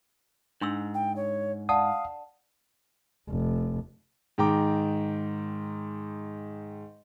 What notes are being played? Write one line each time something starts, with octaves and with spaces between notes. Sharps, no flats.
G#2 D4 C6 E6
G5
C#5
D5 F5 F#5 A5 D#6
F1
G#2 D#3 G5 A#5 D6